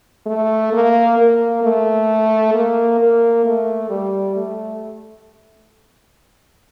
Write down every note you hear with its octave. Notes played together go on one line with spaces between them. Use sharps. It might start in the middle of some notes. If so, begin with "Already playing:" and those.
A3
A#3
A#3
A3
A#3
A#3
A3
G3
A3